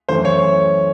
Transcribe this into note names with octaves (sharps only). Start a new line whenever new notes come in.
F#2 E3 A3 C5
C#5